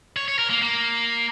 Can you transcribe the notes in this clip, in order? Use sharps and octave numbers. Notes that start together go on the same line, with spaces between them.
C#5
C#5
A#4
A#3
A#3